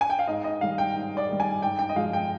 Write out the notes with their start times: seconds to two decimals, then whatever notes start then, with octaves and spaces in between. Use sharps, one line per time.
0.01 G#5
0.10 G5
0.19 F5
0.27 G#2 D#5
0.44 D#5
0.61 D#3 G3 F5
0.78 G5
0.95 G#2
1.17 D5
1.29 D#3 G3
1.40 G#5
1.62 G#2 G5
1.79 G5
1.89 D#5
1.96 F3 G#3 F5
2.13 G5